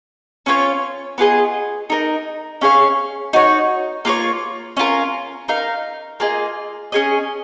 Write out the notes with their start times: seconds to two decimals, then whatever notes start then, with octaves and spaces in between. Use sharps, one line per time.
0.46 C#4 F4 A#4 C#5
1.18 B3 F4 G#4 D#5
1.90 D#4 A#4 D#5
2.61 C#4 G#4 C#5 F5
3.33 D#4 F#4 C#5
4.05 A#3 F4 A#4 C#5
4.77 C#4 F4 A#4
5.48 D#4 A#4 F5
6.20 A#3 F4 G#4 D#5
6.92 C#4 G#4 D#5